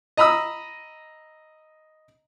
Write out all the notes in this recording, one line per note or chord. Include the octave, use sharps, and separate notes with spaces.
D#5 A#5 B5 D#6 E6